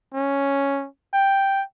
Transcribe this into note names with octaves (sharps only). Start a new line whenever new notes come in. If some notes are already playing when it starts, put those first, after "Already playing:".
C#4
G5